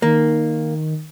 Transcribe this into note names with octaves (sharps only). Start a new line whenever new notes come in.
D#3 A#3